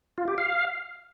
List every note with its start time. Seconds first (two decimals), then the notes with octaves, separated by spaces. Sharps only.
0.18 F4
0.28 G4
0.38 F5